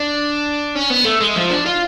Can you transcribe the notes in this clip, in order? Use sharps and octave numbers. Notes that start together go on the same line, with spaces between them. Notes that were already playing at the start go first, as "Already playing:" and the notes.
Already playing: D4
C#4
B3
A3
G#3
F3
D4
F4